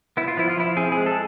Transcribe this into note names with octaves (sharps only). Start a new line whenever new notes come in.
B3 E4
F4
F3 E4
F4
F3 E4
C4 G#4
G#3 G#4
A4